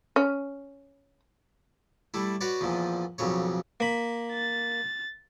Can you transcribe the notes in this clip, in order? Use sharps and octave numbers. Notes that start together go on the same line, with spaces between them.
C#4
G3 A3 E4
F#4 B4 C#5 D5
E2 A#2 F3
B1 F2 C#3 C#5
A#3 B5
A6